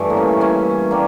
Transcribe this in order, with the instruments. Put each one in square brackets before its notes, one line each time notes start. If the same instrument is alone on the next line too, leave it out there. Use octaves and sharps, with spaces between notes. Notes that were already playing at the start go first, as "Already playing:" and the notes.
Already playing: [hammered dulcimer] G2 E3 A3
A#3
C#4
C#4 E4
G3 A#3